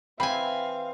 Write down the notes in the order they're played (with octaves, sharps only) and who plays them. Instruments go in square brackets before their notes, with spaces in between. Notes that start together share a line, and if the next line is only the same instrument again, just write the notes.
[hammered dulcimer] E3 [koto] C4 G#5 [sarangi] F5 [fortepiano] B5